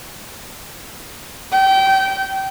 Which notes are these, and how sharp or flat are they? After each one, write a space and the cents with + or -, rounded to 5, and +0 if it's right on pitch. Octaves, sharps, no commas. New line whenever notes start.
G5 -25